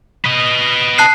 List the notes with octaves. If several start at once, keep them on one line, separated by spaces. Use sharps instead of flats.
B4 D#5
A5 F#6 C7